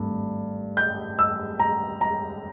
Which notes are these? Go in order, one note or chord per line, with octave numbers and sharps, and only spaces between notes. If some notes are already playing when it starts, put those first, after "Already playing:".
Already playing: G#1 G2 A3
G6
E6
A#5
A#5